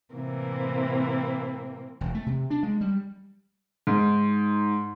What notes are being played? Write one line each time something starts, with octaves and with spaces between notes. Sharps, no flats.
A2 C3 E3 A#3 C4
E1
A3
C3
D4
G#3
G3
G#2